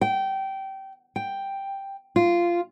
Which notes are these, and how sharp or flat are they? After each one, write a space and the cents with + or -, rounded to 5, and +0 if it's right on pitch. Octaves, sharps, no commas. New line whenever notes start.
G5 -20
G5 +0
F4 -15